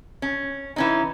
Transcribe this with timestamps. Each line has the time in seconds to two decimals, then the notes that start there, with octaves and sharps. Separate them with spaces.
0.22 C#4
0.76 E3 C#4 D#4